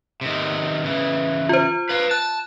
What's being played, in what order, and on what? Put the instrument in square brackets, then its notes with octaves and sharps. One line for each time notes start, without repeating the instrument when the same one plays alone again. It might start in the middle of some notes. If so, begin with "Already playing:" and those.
[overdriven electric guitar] C3 D#3
C#3 E3
[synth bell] F4 C5
[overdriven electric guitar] B4 F5
[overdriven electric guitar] A5 [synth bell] F#6